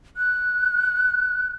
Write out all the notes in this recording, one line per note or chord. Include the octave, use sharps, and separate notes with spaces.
F#6